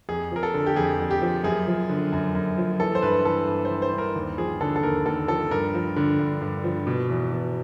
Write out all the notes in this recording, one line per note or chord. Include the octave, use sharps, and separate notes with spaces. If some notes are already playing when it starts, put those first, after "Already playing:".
F2 G#4
F3 A#4
A4
D3
G4
F2 G#4
F2
G4
F3
F#2 G#4
F3
D3
F#2
F#2
F3
E3 A4
C5
G2 B4
E3 A4
G2
C5
E3
C5
G2
A#4
D#2
F3 G#4
D3 A4
A4
D#2 A#4
D#2 A4
F3 A4
G2 A#4
F3
D3
G2
G2
F3
B2
E2
B2